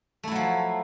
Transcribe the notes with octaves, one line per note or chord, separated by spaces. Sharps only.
F3 F#3 A3 E4